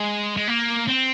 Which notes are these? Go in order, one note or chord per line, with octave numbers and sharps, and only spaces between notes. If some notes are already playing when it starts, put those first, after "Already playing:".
Already playing: G#3
G#3
A#3
C4